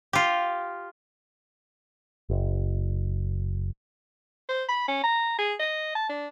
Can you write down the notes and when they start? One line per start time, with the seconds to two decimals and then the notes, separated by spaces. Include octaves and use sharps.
0.13 F4 G4
2.30 F#1
4.49 C5
4.69 B5
4.88 C#4
5.04 A#5
5.39 G#4
5.60 D#5
5.95 A5
6.10 D4